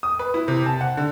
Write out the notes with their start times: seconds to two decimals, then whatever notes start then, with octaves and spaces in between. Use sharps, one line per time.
0.03 D#6
0.19 B4
0.34 E4
0.48 C3
0.66 A5
0.81 F#5
0.97 D3